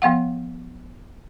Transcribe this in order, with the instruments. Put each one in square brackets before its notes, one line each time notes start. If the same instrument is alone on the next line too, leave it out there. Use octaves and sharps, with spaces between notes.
[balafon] F3 B3 F5 F#5